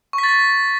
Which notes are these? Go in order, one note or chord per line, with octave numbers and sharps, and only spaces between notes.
C#6
B6
A6
B6